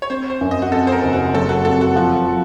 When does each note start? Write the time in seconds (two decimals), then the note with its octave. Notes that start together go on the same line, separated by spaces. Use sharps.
0.02 C#5
0.10 C4 C5
0.30 C5
0.41 F#2
0.51 D#5
0.62 F#4
0.72 F2 A4
0.87 C5
0.92 A#4
1.03 F#1
1.13 F#4
1.34 F#3 A4
1.49 F#4
1.65 F2 A4
1.81 F#4
1.96 F3 F#4
2.27 F3